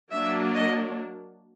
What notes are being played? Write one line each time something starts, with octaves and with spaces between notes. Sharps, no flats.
F#3 A#3 D4 E5
D#5